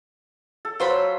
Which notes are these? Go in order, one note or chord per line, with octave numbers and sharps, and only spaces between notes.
A4
F#3 F4 C5 B5